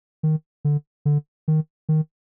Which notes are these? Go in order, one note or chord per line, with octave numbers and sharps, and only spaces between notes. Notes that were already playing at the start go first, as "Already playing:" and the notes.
D#3
D3
D3
D#3
D#3